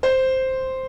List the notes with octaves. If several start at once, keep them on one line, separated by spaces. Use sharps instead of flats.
C5